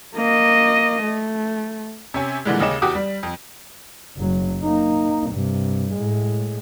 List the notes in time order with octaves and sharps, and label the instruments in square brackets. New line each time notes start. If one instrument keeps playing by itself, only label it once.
[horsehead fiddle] A#3 D#5
A3
[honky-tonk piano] C3 C#4 G#5
A#2 D3 E3 G3 G#3
D#2 C#3 C#4 D#5 D6 E7
E2 F#4 G4 D6 D#6
G3
F2
[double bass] F#1 F#3
A#3 D#4
G2 C3
A2 G#3